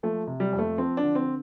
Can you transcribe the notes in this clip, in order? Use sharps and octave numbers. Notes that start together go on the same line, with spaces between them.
F3 A3
C3
G3
F2
A3
F3 C4
D4
D3
C4